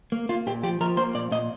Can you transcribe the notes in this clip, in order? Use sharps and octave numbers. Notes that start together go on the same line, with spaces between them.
A#3
A#3 F4
A#2 G4
F3 G4
F3 A#4
A#3 C5
A#2 D5
A#2 D#5